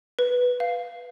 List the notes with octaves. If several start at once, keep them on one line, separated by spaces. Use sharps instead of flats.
B4
F5